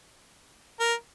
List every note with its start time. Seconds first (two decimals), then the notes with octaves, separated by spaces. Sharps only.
0.80 A#4